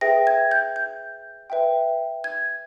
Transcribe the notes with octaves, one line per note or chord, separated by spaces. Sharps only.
G#4 B4 E5 G5 A#6
G#6
G6
G6
B4 E5 G5
G#6